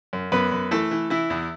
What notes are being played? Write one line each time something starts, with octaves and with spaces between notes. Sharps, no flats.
F#2
F#2 B3 B4
F#2
E3 A3 A4
E3
E3 E4
E2